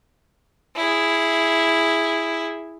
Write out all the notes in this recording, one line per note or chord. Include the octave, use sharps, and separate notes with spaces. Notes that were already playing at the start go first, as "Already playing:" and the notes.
E4 G#4